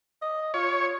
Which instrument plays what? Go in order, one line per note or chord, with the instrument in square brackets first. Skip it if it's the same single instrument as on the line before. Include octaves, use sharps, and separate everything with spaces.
[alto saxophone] D#5
[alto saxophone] F4 [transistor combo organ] C#5